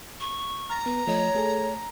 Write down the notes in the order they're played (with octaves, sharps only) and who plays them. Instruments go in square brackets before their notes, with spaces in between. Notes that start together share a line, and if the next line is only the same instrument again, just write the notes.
[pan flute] C#6
[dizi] A#5 [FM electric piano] F6 A6 A#6
[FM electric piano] B3 [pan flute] B4
[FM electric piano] F3 A3 D#5 [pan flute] C#5
[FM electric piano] A3 G#4 A4